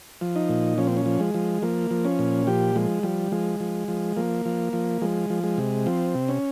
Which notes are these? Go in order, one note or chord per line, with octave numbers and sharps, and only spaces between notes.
F3
D#4
A#2
F3 C#4
C4
C#4
F3
G#3
F3
F3 A#3
F3
C#4
A#2
F3 G4
F3 G#3
F3 G3
F3 G#3
F3
F3
F3 A#3
F3
F3
F3 G#3
F3
G#3
C3
F3 C4
C3
C#4